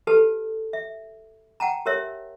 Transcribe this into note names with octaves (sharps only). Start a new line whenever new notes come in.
G4 A4 B4 A5
E5
F#5 G5 A5 A#5
G4 A#4 C#5 E5